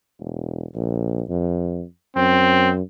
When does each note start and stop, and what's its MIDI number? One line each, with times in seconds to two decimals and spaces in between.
0.20 0.65 28
0.75 1.21 34
1.30 1.83 41
2.16 2.81 42
2.16 2.70 60